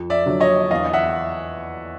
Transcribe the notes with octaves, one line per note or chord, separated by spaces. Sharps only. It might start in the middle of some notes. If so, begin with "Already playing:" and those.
Already playing: F2
D5 E5
D3 F#3
C#5 D#5
E2 D#5 F5
E5 F#5